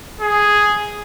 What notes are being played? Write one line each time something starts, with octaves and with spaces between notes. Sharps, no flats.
G#4